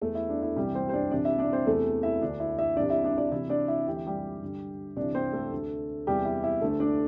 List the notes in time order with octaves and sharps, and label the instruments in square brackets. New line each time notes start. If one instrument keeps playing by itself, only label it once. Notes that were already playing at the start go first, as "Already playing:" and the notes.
[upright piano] E2 E3 A3 A4
E4
D4
E4
C2 C3 E3 G3 G4
C4 C5
C5
D4 D5
C2 C3 E3 D4 D5
E4 E5
D4 D5
C4 C5
E2 C3 E3 A3 A4
E4 E5
D2 D3 D4
E4
E4 E5
C2 C3 E3 D4 D5
E4 E5
D4 D5
D4 D5
C2 C3 E3 E4 E5
D4 D5
E4
D2 C3 E3 G4
E4
G3 G4
G2 D3
C2 C3 E3 D4 D5
C4 C5
A3 A4
D2 D3
E2 C3 E3 G3 G4
E4
E4
D2 D3 A3 A4
D4 D5